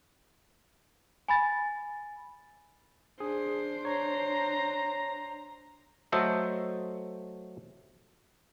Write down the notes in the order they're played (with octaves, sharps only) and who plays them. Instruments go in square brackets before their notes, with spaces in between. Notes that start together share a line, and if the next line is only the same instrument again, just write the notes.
[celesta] G#5 B5 A6
[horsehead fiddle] D4 C5 [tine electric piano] G#4
[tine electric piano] C#5 [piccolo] A#5
[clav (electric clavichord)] F#3 A3 A4 C5 D#5 E5